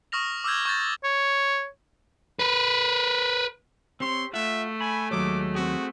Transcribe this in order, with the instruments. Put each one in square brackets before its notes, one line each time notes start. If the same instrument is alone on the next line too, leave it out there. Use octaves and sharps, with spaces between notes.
[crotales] C#6 D#6 F6 A#6 F7
D6 E6 F6 G6 G#6
C#6 G6 A6
[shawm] C#5
[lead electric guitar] A#4 B4
[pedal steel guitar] C4 G4 C#5 [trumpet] C6
[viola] A3 [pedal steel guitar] F4 F#5 [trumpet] E5
[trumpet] G#5 [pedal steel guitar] B5
[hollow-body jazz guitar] D#2 F#3 C#5 [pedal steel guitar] G#3 [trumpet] D6
[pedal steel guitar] C4 G#4 [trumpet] F#4